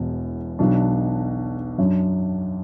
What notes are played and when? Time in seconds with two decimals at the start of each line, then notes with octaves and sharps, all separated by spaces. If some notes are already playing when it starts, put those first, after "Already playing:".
Already playing: E1 E2 B2
0.59 B1 B2 F#3 D4
1.78 F#2 F#3 D4